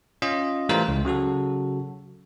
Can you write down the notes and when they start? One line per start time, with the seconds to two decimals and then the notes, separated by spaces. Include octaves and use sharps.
0.22 C#4 F4 D#5
0.69 E3 G3 A3 F4 A#4 C5
0.88 C#2
1.05 C#3 F#3 F#4 A4